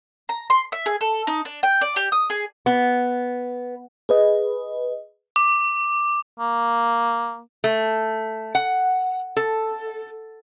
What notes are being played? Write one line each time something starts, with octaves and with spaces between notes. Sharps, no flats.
A#5
C6
E5
G#4
A4
D#4
D4
G5
D5
G4
D#6
G#4
B3
G#4 B4 D#5
D6
A#3
A3
F#5
A4